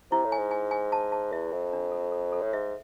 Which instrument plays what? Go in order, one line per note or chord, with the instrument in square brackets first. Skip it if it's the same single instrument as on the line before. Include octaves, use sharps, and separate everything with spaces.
[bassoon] C3 [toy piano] E4
[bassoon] A2
[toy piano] G#5
[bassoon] G#2
[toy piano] G#5
G#5
A5
A5
[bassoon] E2 [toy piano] E5
[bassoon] F2 [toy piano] E5
[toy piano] D4
A4
A4
A4
[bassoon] A2
[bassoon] G#2 [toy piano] E5